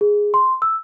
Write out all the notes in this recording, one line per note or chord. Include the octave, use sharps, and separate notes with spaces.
G#4
C6
E6